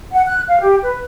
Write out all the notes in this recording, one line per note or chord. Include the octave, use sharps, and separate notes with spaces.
F#5
F#6
F5
G4
B4